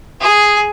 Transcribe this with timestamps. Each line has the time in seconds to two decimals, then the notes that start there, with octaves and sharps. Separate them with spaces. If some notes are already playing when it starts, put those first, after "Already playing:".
0.21 G#4